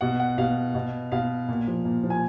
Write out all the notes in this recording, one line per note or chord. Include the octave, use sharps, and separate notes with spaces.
B2 F#5
F#5
B2 F5
B2
B2 F5
A#2
F3
A#2
F3
G#5